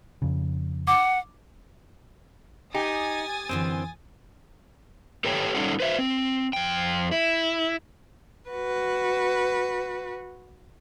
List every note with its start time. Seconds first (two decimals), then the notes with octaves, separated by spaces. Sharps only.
0.22 F2 C#3
0.87 F#5 D6
2.75 D#4 G4 G#5 D#6 A6
3.49 F#2 D3 E3 C4
5.25 G4 A4 B4 C#5 G5
5.55 G3 C#4 D#4 F4 A4 F#5
5.80 B4 C5 E5
5.99 C4
6.53 F2 G5
7.12 E4
8.49 F#4 B4